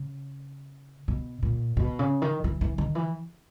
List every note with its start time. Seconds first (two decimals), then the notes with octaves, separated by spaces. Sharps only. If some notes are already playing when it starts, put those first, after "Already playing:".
Already playing: C#3
1.08 B2
1.43 A#2
1.77 B2
1.99 C#3
2.22 D#3
2.44 E3
2.61 E3
2.78 D#3
2.95 E3